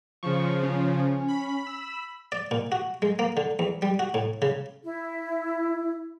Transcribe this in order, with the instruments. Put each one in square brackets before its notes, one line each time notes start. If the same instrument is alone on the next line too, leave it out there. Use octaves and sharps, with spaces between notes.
[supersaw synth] C#3 F3 [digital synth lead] C#6
[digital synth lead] C#4
[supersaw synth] B5
[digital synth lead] E6
[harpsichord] D5
A#2
F#4
G#3
A#3
D3
E2
G3
F#4
A2
C#3
[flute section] E4